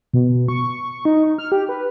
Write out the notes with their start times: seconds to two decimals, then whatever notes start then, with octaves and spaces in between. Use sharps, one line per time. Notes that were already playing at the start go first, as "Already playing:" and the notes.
0.14 B2
0.48 C#6
1.05 D#4
1.38 F6
1.52 G4
1.69 B4